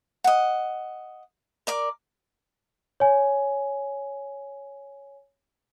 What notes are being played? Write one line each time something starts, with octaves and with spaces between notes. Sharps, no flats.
D#5 F#5
A#4 D5 D6
C#5 G#5